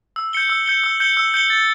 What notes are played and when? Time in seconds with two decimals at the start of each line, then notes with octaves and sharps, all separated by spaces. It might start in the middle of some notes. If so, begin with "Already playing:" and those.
0.16 E6
0.33 G6 C#7 G7
0.49 E6
0.66 G6 C#7 G7
0.84 E6
1.00 G6 C#7 G7
1.17 E6
1.34 G6 C#7 G7
1.50 A6